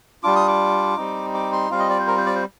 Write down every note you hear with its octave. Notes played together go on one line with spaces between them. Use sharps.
G3 D4 F4 D6
D#6
D6
G3 C4 D#4
D6
C6
G3 C4 F4 F5
D#5
D5
C5
A#4
C5
D5
C5